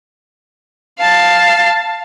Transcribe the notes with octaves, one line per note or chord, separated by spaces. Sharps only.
F5 A5